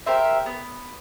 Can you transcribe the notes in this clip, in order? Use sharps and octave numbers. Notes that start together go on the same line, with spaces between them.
G4 A#4 C5 E5
B3